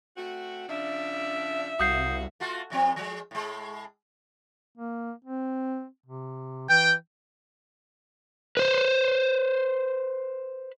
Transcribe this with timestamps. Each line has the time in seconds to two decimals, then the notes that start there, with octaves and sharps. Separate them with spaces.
0.17 A3 C4 F#4
0.69 C#3 F3 D4 E5
1.80 C2 F#4 F5 D#6 G6 C7
2.40 A3 F4 F#4
2.70 A2 F3 C4
2.96 F3 G#3
3.31 A2 G#3
4.77 A#3
5.24 C4
6.06 C3
6.69 E3 G5
8.57 B4 C5